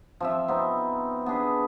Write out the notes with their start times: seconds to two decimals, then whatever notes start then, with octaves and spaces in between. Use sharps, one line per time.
0.20 F3 C4 E5
0.48 B3 C4 D#4
1.26 B3 D4 G#4 B4